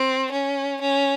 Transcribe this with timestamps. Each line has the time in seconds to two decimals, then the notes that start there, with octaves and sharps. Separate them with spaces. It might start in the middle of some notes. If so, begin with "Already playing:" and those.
Already playing: C4
0.32 C#4
0.81 C#4